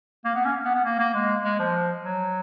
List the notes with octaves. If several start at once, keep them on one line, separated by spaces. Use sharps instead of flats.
A#3
B3
C#4
B3
B3
A#3
A#3
G#3
G#3
F3
F#3